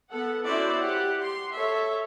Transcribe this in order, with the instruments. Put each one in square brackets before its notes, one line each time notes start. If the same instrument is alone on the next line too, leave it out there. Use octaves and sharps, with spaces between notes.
[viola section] B3 A4 F#5
C#4 E4 F#4 C5 D5 E5
G4 F#5
C6
A4 C#5 E5